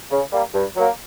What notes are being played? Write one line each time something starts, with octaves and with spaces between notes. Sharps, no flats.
C#3
G3 A#3
G2
F#3 A#3